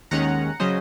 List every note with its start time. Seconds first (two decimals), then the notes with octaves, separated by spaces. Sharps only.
0.11 D#2 D#3 G#3 C#4 F#5 A#5
0.60 C#3 F#3 C#4 C5 D#5